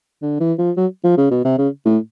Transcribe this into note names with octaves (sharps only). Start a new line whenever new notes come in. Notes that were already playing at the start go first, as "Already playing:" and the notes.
D3
E3
F3
F#3
F3
C#3
B2
C3
C#3
A2